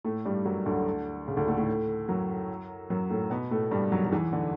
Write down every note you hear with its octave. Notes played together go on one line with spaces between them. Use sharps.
A2 A3
G2 G3
F#2 F#3
D2 D3
C#3
D2 D3
A2 A3
A2 A3
F#2 F#3
F#2 F#3
A2 A3
B2 B3
A2 A3
G2 G3
F#2 F#3
F#3
E2 E3
D3